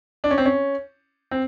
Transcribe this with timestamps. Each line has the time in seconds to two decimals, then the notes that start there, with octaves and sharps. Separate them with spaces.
0.24 D4
0.31 C#4
0.38 C4
0.45 C#4
1.31 C4